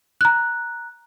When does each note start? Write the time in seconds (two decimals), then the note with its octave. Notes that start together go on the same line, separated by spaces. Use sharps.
0.21 A#5 F#6